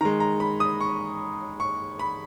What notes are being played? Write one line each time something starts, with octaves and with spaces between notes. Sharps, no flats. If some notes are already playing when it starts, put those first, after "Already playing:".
D#3 G#3 A#5
A#5
B5
D#6
C#6
C#6
B5